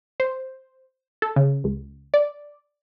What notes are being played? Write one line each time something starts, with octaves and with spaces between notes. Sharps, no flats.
C5
A4
C#3
C#2
D5